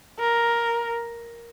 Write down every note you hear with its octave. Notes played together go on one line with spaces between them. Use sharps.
A#4